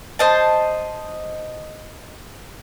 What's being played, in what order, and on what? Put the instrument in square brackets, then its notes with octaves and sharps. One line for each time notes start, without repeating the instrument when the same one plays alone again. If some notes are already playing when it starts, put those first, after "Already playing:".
[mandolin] C5 D#5 A5